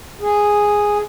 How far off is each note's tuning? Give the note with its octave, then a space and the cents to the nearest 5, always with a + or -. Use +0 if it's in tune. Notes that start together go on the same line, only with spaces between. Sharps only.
G#4 -5